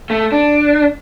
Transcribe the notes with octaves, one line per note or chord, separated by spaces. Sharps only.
A3
D4